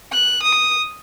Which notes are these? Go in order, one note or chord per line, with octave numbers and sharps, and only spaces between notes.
F#6
D#6